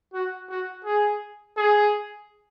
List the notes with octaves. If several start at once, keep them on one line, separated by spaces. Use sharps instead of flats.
F#4
F#4
G#4
G#4